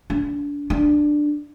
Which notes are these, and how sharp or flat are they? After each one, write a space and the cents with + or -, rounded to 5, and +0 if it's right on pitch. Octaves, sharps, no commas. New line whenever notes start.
D4 -30
D4 +10